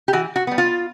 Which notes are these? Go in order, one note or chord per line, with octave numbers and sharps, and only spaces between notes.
G4
E3 F#4
F#4
G3 B3
F4